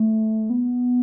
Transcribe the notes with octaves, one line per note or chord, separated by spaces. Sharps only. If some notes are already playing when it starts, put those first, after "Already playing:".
Already playing: A3
B3